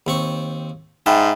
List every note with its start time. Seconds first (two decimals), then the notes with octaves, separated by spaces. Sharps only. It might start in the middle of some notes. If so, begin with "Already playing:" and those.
0.07 D#2 C4 C#6
1.06 G#2 E5 G5 A5 B5